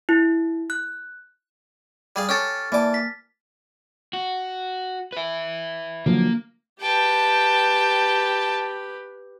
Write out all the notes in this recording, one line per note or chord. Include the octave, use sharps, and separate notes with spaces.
E4
F#6
G3 G#4 F5
C#4 G4 A4 F6 A6
E3 A#3 D5 A5 D6
B6
F#4
B4 E5
D3 F3 F#3 A#3
G4 B4 G5 A5